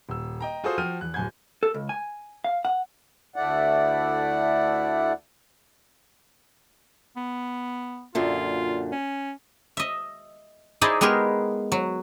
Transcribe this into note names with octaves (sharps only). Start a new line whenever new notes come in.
D#1 E6
D#5 G5 A#5
F4 F#4 G#4 A4 C5 D#6
F3 F#4 G5 F6 D#7
E2 F#6
D1 F#2 G#5 G6 G#6
A4
C#2
G#5
F5
F#5
D2 A3 E4 D5 F#5
B3
F#2 A#2 D3 F4
C#4
D#5 E5
D#4 E4 G#4 C5 D5 D#5
G#3 B3 G4 G#4 A#4
F#3